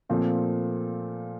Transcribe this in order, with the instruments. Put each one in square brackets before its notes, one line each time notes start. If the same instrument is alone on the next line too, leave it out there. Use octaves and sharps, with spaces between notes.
[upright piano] A#2 F3 A3 C4 F4